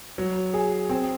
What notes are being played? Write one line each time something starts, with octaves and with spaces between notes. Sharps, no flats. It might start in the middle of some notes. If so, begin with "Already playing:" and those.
F#3
G#4
C4